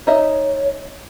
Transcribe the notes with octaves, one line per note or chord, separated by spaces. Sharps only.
D#4 C#5 D#5 E5